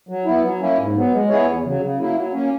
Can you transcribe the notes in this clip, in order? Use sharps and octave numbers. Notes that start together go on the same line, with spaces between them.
F#3
B3 E4
F#3
A#3 C#4 E4
G#2
F#3 B3
G#3
B3 E4 G#4 C#5
E2
C#3 F#3
C#3
F#3 A#3 E4
F#3
A#3 C#4